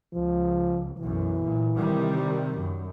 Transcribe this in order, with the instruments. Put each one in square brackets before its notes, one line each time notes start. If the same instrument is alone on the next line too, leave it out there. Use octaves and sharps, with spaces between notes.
[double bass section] C#2 [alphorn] F3
[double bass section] B1 F#2 [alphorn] E3
[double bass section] A#2
C3 D#3 G3
F#2